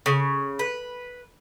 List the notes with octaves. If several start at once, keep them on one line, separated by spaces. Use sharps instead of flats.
C#3
B4